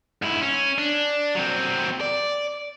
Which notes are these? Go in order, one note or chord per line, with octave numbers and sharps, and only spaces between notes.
G#2 E4
C#4
D4
F#3 C4
D5